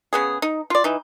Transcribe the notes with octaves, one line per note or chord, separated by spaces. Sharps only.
C#3 B3 G#4
D#4
F4 D5
E3 D#4